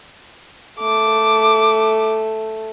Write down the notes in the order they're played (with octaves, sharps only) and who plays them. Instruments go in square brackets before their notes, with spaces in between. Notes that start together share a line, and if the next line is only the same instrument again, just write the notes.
[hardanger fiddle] A3 [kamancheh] D6